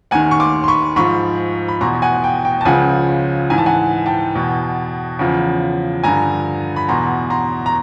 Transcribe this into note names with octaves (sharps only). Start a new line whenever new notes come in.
D#2 D#3 F#5 G#5
C#6
C6 D6
C6
B5 C#6
G#2 F3 B5 C#6
B5
E2 B2 A#5 C6
F#5 G#5
G5
G5
A5
C#2 C#3 F3 F#5 G#5
G#2 E3 G#5
A5
F#5 G#5
G5 A5
E2 B2
E2 C#3 F3
G2 D3 F3 G#5 A#5
B5
E2 B2 A#5 C6
A#5 C6
A#5